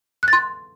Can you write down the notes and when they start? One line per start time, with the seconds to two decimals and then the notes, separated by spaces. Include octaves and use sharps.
0.23 F#6
0.28 A6
0.33 C6